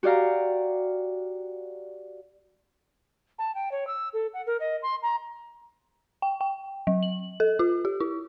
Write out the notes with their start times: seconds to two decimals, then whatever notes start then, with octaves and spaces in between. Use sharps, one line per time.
0.03 F#4 G4 D5 F5 A#5
3.39 A5
3.55 G5
3.72 C#5
3.87 E6
4.13 A4
4.34 F#5
4.47 A#4
4.60 D#5
4.83 C6
5.03 A#5
6.22 G5
6.41 G5
6.87 F#3
7.03 F#7
7.40 A4
7.59 F4
7.85 G4
8.00 E4